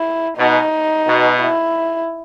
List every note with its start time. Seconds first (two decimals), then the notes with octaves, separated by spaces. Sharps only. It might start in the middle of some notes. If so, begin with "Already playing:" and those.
Already playing: E4
0.38 B2 D#4
1.06 B2
1.39 E4